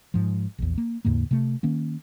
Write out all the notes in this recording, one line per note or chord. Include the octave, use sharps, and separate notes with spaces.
G#2 F3
A#1 E2
A#3
D#2 G#2 C#3 A#3
C3 A3
D#3 A#3 C#4